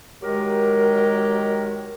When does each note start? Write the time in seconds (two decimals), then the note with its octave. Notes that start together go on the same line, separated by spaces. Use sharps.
0.23 D#3 F#3 G#3 G4 A#4